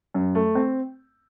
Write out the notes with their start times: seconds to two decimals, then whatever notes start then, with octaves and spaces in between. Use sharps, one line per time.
0.14 F#2
0.35 A3
0.55 C4